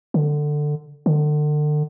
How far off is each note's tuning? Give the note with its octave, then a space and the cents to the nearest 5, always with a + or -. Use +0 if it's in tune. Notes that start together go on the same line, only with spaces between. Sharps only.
D3 +15
D3 +35